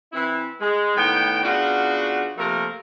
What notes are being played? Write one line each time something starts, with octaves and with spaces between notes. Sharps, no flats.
E3 C4 E4
G#3
A2 D#3 B3 G5
C#3 B3 D4 F4 F#4
C3 F3 A3 A#3 A#4